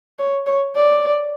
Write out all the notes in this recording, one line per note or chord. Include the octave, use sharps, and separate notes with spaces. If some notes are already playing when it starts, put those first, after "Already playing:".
C#5
C#5
D5